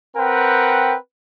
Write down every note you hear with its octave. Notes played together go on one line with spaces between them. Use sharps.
C4 A#4 B4 F#5 G5